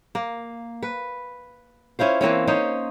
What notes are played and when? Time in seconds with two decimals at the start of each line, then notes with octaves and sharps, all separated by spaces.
0.15 A#3
0.83 B4
1.99 C#4 E4 F4 C5
2.21 E3 A#3 C4 C#4
2.47 C#4 D#4 C5